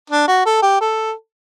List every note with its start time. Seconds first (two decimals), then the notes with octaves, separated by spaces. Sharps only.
0.10 D4
0.28 F#4
0.46 A4
0.62 G4
0.81 A4